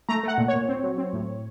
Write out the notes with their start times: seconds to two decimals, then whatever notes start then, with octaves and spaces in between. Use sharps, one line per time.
0.09 A3 A#5
0.23 A3 F#5
0.38 A#2
0.48 A#2 C#5
0.69 C4
0.83 F#3
0.98 C4
1.13 A2